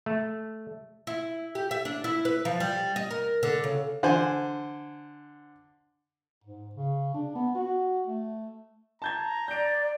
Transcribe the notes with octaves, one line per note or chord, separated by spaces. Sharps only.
A3
E4
G4
E5
D4
E4
B4
F3
G3
D#5
A#4
D3
C#3
D3 C5 G#5
G#2
C#3
D4
B3
F#4
A3
A5 A#5 G6 G#6
D5 G6 D7